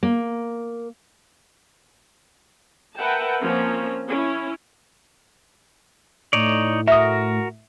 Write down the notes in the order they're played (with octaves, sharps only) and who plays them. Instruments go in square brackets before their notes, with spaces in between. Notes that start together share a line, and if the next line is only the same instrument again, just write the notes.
[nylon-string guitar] A#3
[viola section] A#4 B4 E5 F#5 G5 A5
F3 A#3 C4 C#4
C#4 E4
[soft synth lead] A2 [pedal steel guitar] D#4 C#5 D5
[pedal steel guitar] F#4 A#4 [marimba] E5 D#6